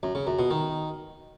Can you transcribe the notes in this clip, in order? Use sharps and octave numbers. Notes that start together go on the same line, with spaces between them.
F#2
C#3
F#2
B2
D#3